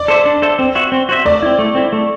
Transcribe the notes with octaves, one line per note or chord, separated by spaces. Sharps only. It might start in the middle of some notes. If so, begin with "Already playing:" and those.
Already playing: D5
A4 C5 E5
D4
A4 C5 E5
C4
F#4 C5 E5
C4
F#4 C5 E5
A3 D5
C4 E4
A3
C4 E4
A3